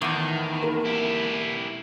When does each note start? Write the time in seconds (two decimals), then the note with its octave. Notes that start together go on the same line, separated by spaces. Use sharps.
0.02 E2 A2 D#3
0.62 A#3
0.85 E4 G4